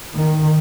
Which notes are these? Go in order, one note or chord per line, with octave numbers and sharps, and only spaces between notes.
D#3